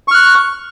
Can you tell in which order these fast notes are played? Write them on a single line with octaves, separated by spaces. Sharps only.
C#6 F6 F#6